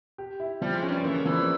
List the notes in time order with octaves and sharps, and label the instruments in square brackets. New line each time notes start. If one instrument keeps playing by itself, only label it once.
[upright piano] G4
E4
[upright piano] F3 [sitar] G3
[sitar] G#3
[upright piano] C#4
[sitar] G2 G3
[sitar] E3 [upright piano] A#3
[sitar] C#3
[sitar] E2 E3 [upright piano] F3